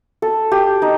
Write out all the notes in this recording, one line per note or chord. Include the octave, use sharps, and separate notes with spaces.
A4
G4
D#4